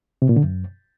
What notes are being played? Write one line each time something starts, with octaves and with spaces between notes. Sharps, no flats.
C3
A#2
D3
F#2